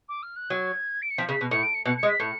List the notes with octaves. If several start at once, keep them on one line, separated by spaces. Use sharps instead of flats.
D6
F6
F#6
F#3 G#6
D7
C#7
F3 B6
C#3 B6
B2
A2 C#7
D7
C#7
B2 C#7
C#7
G#3
B6
A2 C#7